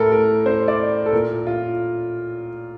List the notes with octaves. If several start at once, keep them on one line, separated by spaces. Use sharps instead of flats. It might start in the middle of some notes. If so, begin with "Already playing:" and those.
Already playing: A2 A4 A#4
A#4
C5
D5
A4
A#2 A#4
F4